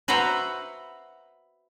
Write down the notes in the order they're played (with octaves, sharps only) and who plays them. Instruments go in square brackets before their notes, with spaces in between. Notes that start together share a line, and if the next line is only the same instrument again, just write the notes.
[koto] F#4 B4 C5 E5 F#5 A#5